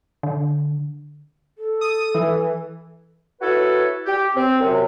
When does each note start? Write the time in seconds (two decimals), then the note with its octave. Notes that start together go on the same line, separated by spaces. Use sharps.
0.23 D3
1.58 A4
1.81 D#6
2.15 E3
3.41 E4 F#4 A4 B4 C#5
4.05 G4
4.35 C4
4.60 F#2 C3